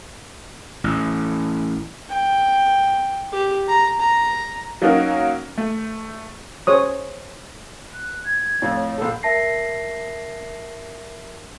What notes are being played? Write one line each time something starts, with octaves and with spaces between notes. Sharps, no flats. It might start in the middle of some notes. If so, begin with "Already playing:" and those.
A1
G5
G4
A#5
A#5
F#3 A#3 C#4 D#4 F#4 A#4
A3
G#4 C5 C#5 D#6
F#6
G#6
F2 A2
C#5
A#1 A4
A#4 E5 A5 A#6 C7